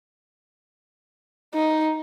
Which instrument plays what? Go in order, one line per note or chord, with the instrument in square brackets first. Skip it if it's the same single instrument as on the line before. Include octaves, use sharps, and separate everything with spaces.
[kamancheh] D#4